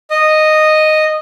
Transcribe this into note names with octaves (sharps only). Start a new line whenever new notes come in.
D#5